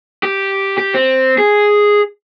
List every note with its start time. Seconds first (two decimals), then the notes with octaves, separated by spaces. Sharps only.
0.23 G4
0.78 G4
0.94 C4
1.38 G#4